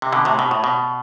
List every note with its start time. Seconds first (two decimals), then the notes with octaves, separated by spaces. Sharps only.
0.02 C3
0.13 B2 D3
0.25 A2 C3
0.39 B2
0.51 A2
0.64 B2